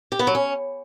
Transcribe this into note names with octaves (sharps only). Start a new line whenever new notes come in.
G4
B3
F#3
C#4